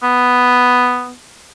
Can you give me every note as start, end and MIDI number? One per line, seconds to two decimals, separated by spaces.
0.03 1.12 59